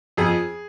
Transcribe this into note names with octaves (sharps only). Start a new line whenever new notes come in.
F2 G#4